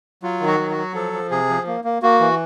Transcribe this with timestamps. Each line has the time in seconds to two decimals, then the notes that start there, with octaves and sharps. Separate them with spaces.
0.23 F#3 F4
0.40 D#3
0.47 F#4
0.59 F#3
0.71 F#4
0.77 F#3
0.94 F3 A4
1.13 F3
1.31 C3 G#4
1.49 F3
1.67 A#3
1.84 A#3
2.02 A#3 F#4
2.20 E3